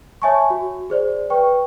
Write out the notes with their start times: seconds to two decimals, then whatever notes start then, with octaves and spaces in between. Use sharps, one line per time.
0.22 C#5 E5 G#5 A5 C#6
0.50 F#4
0.90 G#4 C5 D5
1.30 B4 G5 C#6